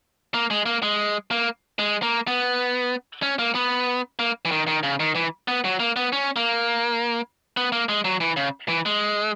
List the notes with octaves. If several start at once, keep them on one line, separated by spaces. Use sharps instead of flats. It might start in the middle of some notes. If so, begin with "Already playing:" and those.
A#3
G#3
A#3
G#3
A#3
G#3
A#3
B3
C#4
A#3
B3
A#3
E3
D#3
D#3
C#3
D#3
E3
B3
F#3
A#3
B3
C#4
A#3
B3
A#3
G#3
F#3
E3
C#3
E3
G#3